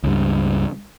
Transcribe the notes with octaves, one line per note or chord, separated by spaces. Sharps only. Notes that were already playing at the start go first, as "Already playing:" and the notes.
C#2 G2